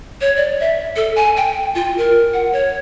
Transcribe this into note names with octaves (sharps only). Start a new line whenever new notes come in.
C#5
D5
E5
A4
G#5
G5
F4
A#4
F#5
C#5